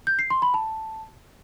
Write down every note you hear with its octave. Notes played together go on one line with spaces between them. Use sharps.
G6
C7
C6
B5
A5